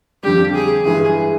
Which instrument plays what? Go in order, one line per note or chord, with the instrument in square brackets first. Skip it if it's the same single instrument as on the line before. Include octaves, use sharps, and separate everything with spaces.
[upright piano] F2 D3 G3 [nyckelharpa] G4
[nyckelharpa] G#4
[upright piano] G2 E3 G#3 [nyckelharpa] G#4